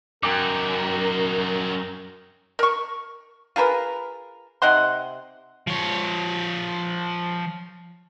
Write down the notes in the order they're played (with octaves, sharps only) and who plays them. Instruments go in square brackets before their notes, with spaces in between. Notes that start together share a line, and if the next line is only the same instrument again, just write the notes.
[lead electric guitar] F#2 [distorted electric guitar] D#4 F#4 [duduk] A#4 [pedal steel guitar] G5 A#5 D6
[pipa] A#4 C#6
F4 G#4 A#4 B4
C3 D#4 F#5 C6
[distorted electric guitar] F3 C#5